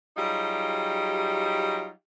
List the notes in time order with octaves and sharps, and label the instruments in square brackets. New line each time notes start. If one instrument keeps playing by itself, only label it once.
[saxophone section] F#3 G3 D#4 F4 G4 G#4